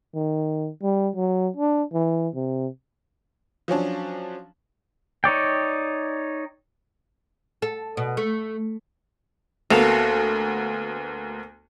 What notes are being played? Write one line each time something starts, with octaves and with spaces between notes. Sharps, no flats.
D#3
G3
F#3
D4
E3
C3
F3 F#3 C#4 D4
D#4 C#5 D5 G5
A4
B2
A3
D2 A#3 B3 F#4 A4 F5